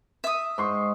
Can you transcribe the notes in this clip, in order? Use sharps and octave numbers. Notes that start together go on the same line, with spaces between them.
E5 D#6
G#2 C6 C#6